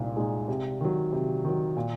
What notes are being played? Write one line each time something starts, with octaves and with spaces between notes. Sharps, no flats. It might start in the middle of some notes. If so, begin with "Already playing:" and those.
Already playing: C2 A#2 G#3 D#4
A#2 G#3 D#4
C3
D#3 F#3
C3
D#3 F#3
A#2